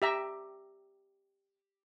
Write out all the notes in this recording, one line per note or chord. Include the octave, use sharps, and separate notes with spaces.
G4 E5 A#5